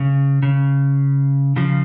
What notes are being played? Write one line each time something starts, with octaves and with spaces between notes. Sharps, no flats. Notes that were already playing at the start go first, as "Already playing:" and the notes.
Already playing: C#3
C#3
C#3 F3